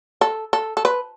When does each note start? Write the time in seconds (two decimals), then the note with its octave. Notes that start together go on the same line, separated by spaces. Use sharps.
0.21 A4
0.53 A4
0.77 A4
0.85 B4